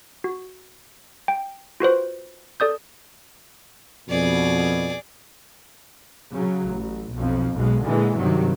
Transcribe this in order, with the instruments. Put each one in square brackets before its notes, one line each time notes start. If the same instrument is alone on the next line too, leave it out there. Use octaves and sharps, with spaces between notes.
[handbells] F#4
G5
F4 F#4 B4 C5
A4 D5 D#6 G6
[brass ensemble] F2 B2 [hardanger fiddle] G#4 D5
[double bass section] C#3 F#3
A1
B1 F2 F3
B1 B2 G#3
A#2 D3 E3 G#3
G2 C3 D#3 F#3